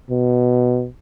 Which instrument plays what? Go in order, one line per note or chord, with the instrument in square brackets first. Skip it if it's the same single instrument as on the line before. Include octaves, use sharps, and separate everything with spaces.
[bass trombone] B2